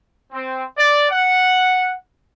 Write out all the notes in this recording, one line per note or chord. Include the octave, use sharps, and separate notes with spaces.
C4
D5
F#5